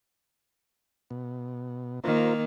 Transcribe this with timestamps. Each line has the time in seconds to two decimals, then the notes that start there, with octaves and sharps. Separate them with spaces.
1.11 B2
2.04 D#3 A#3 F4 A#4 C5